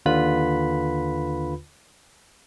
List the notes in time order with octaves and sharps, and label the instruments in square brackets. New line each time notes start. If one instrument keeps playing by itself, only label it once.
[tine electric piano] D#2 D3 F4 B4 B5 B6